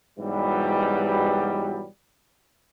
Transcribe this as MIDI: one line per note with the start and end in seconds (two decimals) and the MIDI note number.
0.19 1.86 44
0.19 1.86 47
0.19 1.86 52
0.19 1.86 54
0.19 1.86 55